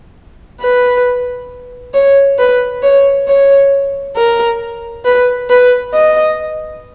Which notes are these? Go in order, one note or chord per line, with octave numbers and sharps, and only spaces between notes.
B4
C#5
B4
C#5
C#5
A#4
B4
B4
D#5